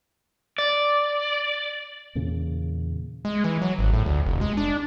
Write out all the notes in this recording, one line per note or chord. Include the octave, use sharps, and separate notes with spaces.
D5
E2 A#2 C#3
G#3
E3
F#3
G#1
A2
D2
F1
G#3
D4